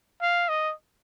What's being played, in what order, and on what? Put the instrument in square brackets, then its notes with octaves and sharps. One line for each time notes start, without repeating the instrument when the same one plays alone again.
[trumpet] F5
D#5